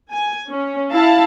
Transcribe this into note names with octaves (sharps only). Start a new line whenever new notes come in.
G#5
C#4
E4 F5 A5